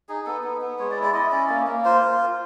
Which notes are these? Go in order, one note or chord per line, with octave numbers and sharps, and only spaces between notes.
D#4 G#4
B3 A4
B3
B3
G#3 C#5
D5
E4
D5
E4 D#5
C#4 D5
A#3
A#3
F4 C5